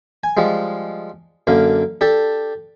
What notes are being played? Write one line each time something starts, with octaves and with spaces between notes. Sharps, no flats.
G#5
F3 G3 G#3
F#2 D3 A#3
D4 G4 A4